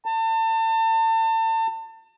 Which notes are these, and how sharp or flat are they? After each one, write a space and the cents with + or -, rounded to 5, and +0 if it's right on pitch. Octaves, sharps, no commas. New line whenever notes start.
A5 +35